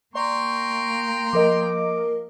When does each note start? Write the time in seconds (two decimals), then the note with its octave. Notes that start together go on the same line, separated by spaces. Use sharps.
0.15 A#3 D5 G5 A#5 C6 C#6
1.33 F3 A#4 D#5 D6